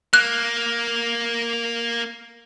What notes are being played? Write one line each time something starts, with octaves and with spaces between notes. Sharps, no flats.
A#3 F#6